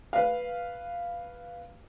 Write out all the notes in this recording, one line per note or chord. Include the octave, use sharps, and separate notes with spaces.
B4 F5